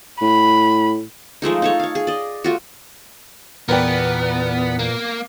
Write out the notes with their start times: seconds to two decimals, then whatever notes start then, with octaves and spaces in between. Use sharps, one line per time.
0.21 A2 B5
1.42 F3 G#3 A3 D#4
1.62 D#4 A4 C#5
1.80 C#5 F5
1.95 G#4
2.07 D5 D#5
2.44 A3 F4 F#4
3.69 E2 A#2 B3 A#4 B4 D5 G5
4.79 A#3